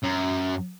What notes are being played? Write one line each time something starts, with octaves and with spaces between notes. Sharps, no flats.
F#2